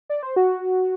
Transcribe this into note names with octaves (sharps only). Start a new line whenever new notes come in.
D5
C5
F#4